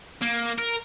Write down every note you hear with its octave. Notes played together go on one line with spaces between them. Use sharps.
A#3
A#4